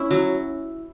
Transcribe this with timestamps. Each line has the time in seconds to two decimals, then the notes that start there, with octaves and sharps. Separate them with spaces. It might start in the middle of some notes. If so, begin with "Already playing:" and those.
Already playing: C#4 E4
0.11 F#3